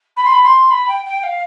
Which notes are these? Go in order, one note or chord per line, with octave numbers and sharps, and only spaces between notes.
B5
C6
B5
C6
B5
G5
G5
F5